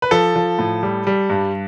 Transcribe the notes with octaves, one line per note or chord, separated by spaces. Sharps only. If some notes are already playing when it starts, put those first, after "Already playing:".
B4
F3 A4
F3
A2
G3
G3
G2